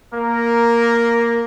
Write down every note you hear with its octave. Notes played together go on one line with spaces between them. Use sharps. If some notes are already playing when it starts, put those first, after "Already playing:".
A#3 A#4